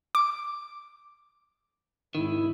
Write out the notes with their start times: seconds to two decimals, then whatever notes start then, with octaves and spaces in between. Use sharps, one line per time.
0.15 D6
2.15 G#1 D#3 E4